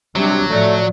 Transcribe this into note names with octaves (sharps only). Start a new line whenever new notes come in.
C3 F#3 G3 D4
A2 F3 A3 D5